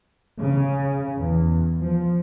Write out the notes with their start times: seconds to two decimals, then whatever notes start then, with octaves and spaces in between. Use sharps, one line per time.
0.40 C#3
1.19 E2
1.82 F3